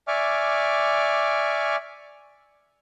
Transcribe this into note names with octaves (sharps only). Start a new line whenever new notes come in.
D5 E5 G#5 C#6 D6 F6